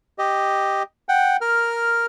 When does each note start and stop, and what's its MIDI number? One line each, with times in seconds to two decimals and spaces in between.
0.18 0.83 67
0.18 0.83 75
1.09 1.37 78
1.09 1.37 79
1.41 2.06 70
1.41 2.06 89